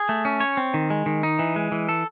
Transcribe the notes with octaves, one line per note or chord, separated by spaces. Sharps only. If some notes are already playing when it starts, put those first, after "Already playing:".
Already playing: G#4
A3
C#4
C#5
C4
D#3
G#3
D#3
D#4
E3
G#3
E3
A4